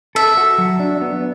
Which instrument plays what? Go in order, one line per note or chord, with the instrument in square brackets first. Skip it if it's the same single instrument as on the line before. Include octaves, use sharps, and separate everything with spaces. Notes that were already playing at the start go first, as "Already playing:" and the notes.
[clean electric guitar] A4 [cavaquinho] E5
[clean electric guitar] F#4
F#3
D4
B3